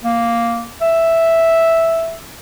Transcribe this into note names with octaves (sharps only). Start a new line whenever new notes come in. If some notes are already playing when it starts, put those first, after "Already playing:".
A#3
E5